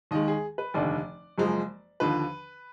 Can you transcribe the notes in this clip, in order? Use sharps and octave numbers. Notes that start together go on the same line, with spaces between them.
D#2 D#3 G#3 D#5
G#4
B4
F1 D#2 D3 D5
F#1 F#2 F3 G#3
D#2 D3 F3 B4